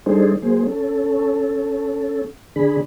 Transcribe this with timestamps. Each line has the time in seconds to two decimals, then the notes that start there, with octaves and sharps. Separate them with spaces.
0.06 G3 D4 D#4 G#4 A4 C5
0.42 F#3 A#3 G#4 C5
0.67 C#4 A4
2.56 D3 D4 G#4 B5